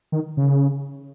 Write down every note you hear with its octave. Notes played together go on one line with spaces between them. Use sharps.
D#3
C#3